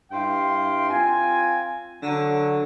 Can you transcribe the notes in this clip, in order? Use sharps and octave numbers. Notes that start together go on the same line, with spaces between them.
G2 E4 F5 G5 C6
C4 F4 G#5
D3 F#3